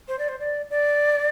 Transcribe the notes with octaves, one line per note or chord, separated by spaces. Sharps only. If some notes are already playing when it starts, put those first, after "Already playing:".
C5
D5
C5
D5
D5